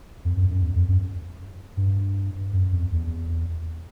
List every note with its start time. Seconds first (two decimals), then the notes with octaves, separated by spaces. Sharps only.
0.25 F2
0.37 F#2
0.50 F#2
0.62 E2
0.75 F2
0.89 F#2
1.77 G2
2.53 F#2
2.72 F2
2.92 E2